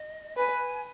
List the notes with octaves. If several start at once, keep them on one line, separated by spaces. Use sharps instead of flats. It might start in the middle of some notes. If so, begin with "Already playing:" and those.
Already playing: D#5
B4 G#5